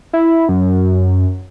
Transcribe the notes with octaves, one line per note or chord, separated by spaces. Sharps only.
E4
F#2